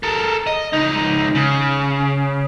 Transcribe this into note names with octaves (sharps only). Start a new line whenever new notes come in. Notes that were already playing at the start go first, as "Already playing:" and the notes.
A4 A#4
D#5
C#2 D#4
C#3